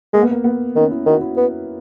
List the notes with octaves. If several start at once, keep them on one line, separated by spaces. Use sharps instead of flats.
G#3 A#3
B3
A#3
B3
D#3 C#4
E4
D#3 F#4
E4
B3